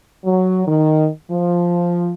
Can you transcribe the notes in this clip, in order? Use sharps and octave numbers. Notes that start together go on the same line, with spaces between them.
F#3
D#3
F3